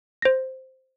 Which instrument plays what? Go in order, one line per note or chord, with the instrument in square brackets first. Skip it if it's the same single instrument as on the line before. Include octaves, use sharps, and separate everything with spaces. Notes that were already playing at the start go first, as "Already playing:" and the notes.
[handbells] C5 A#6